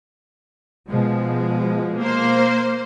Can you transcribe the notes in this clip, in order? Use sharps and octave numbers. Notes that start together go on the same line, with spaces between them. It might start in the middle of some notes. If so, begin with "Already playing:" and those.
B2 F3 G#3
A#3 C5